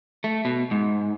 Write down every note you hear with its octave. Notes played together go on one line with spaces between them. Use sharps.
A3
B2
G#2